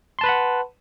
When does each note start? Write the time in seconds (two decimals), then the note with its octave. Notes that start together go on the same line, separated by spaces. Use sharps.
0.19 C6
0.21 A5
0.24 B4
0.26 B5
0.29 F#5